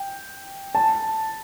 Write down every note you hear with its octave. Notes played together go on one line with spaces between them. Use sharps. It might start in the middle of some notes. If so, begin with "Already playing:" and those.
Already playing: G5
A5